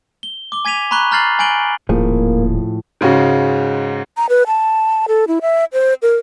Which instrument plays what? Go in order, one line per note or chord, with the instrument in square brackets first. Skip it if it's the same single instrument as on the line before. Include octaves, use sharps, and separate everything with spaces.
[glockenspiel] G7
D6 G7
G#5 G#6 B6 D#7 F7
A#5 B5 C#6 F#6 G7
A#5 F6 G6 A6 C7 F#7
G#5 G6 D7 F#7 G7
[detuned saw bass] D#1 [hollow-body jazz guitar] A2 F3 G#4 [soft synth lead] A#3
[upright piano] G#2 C#3 G#3 F#4
[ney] A#5
B4
A5
A4
E4
E5
C5
A#4